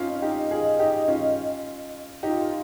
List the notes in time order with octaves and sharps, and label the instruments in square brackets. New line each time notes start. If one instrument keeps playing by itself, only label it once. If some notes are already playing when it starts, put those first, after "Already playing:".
Already playing: [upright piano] C4 C#4 D#4 F4
[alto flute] D#5
[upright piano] D#4 G4
F4 G#4
D#4 G4
C#4 F4
[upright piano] D#4 G4 [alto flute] F4